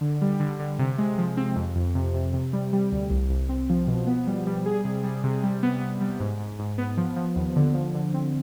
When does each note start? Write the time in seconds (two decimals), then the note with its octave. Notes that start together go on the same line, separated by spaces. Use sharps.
0.01 D3
0.21 G3
0.40 D3
0.60 D3
0.79 C3
0.98 G#3
1.18 F3
1.37 C4
1.56 F2
1.75 F2
1.95 C3
2.14 C3
2.33 C3
2.53 G3
2.73 G3
2.92 D2
3.10 C2
3.30 C2
3.49 C4
3.69 F3
3.88 B2
4.07 B3
4.27 G3
4.47 G3
4.66 G#4
4.84 C3
5.04 G3
5.24 C3
5.43 G3
5.63 B3
5.81 B3
6.01 G3
6.20 G#2
6.40 G#2
6.59 G#2
6.78 B3
6.97 F3
7.16 F3
7.36 D#2
7.56 D3
7.74 F3
7.95 D3
8.14 C4